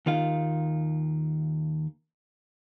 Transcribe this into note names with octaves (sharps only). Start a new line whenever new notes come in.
D#2 D#3 F4 F5